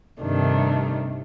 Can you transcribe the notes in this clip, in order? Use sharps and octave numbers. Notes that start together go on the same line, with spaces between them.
G2 C3 D#3 A3 D4